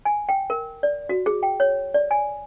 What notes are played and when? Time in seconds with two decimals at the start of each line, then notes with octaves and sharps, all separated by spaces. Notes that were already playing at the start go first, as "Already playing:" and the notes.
0.05 G#5
0.29 G5
0.50 A#4
0.83 D5
1.09 F#4
1.26 G#4
1.43 G5
1.60 C#5
1.94 D5
2.11 G#5